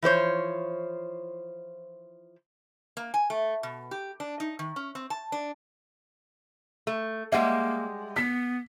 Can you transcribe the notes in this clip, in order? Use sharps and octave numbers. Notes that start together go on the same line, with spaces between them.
E3 F3 C5 C#5
A#3
G#5
A3
B2
G4
D4
D#4
D#3
C#4
C4
A5
D4
A3
G3 G#3 A#3 E5 F#5
B3 B6